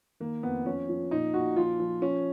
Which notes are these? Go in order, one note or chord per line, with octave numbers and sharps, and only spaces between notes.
D#3 A#3
F2 B3
F3 C#4
F3
A#2 D#4
A#2 F#4
F3 F4
F3
F3 C#4